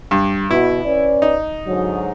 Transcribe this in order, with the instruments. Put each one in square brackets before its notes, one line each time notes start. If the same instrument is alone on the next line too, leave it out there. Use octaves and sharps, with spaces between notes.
[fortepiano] G2
[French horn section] B2 [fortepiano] E4
[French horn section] C#4 B4 D5
[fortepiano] D#4
[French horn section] G#2 D3 F#3